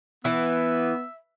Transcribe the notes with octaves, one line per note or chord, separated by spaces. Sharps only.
E3 B3 E5